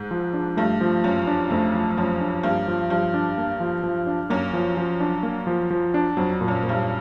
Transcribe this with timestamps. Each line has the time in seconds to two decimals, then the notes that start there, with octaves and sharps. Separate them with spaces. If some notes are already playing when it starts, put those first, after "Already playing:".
Already playing: G#2
0.11 F3
0.33 D4
0.57 G2 A3
0.81 F3
1.04 F#2 F3
1.27 D4
1.50 F2 A3
1.74 F3
1.97 F#2 F3
2.20 D4
2.43 G2 A#3
2.68 F3
2.90 G2 F3
3.14 D4
3.38 A#3
3.60 F3
3.83 F3
4.07 D4
4.30 F#2 A#3
4.53 F3
4.77 F3
5.00 D4
5.23 A#3
5.47 F3
5.71 F3
5.94 D4
6.17 F2 F#3
6.41 A#2
6.48 F#2
6.63 A#2
6.69 G2